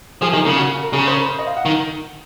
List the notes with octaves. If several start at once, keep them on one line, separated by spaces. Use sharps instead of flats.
F3 G#4
D#3 G#4
C#3 A#4
F#4
A#4
C#3 G#4
C5
A#4
C5
D#5
F5
F#5
D#3